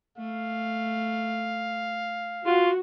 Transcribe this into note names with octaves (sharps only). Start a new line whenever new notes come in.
A3 F5
F4 F#4